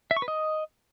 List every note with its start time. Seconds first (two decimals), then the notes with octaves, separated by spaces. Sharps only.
0.11 E5
0.17 C#6
0.22 B4
0.28 D#5